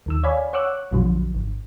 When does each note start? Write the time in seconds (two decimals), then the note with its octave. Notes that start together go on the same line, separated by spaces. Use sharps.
0.06 D#2 D#3 E6
0.23 C#5 D5 F5 G#5 B5
0.53 C#5 F#5 C#6 D6 E6 F#6
0.91 A#1 F2 B2 D3 F3 F#3
1.35 G#1